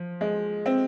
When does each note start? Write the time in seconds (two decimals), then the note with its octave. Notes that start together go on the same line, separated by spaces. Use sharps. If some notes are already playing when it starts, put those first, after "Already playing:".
Already playing: F3
0.21 G#3
0.66 C4